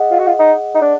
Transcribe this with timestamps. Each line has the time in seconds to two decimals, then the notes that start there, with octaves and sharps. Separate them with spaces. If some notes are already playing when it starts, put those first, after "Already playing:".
Already playing: G#4 D#5 F#5
0.11 F4
0.19 F#4
0.27 F4
0.39 D#4
0.75 D#4
0.81 D4